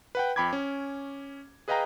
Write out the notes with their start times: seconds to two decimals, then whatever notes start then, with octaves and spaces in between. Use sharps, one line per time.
0.15 B4 F#5 G5
0.36 F2 G5 B5 D6 G#6
0.53 C#4
1.68 G#4 B4 D#5 F5 G5 A#5